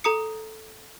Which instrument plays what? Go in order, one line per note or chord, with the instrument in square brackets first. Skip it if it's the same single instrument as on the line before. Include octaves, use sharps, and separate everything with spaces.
[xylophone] A4 A#5 D#6 C#7